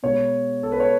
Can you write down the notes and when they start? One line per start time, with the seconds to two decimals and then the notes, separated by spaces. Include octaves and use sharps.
0.03 B2 G#3 C#5
0.63 A4
0.72 B4
0.80 C#5